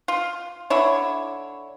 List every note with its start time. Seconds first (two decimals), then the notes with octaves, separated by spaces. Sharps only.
0.08 F4
0.70 D3 E4 C#5